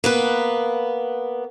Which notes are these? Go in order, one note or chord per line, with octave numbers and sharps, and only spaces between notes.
A#3 B3 B4